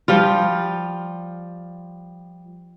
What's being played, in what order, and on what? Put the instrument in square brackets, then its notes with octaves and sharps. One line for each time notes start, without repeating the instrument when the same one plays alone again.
[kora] F3 G3 F4